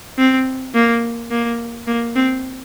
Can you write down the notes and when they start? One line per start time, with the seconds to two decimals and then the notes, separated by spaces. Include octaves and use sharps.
0.18 C4
0.74 A#3
1.31 A#3
1.87 A#3
2.16 C4